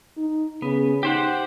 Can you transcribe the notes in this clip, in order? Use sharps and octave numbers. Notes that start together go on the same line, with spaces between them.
D#4
C#3 B3
D#4 G4 C5 F#5